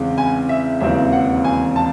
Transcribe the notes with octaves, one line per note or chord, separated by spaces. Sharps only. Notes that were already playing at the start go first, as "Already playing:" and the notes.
Already playing: E2 C#3 G#3 C4
G#5
E5
E1 D#2 C#3 E3 C4 E5
F#5
G#5
A5